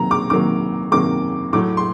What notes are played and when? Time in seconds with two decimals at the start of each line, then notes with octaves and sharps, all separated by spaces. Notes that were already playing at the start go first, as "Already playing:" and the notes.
Already playing: C3 D#3 F#3 A#3 A#5
0.11 D6
0.30 C3 D#3 F#3 A#3 D6
0.92 C3 D#3 F#3 A#3 D6
1.53 A2 F#3 A3 D6
1.77 C6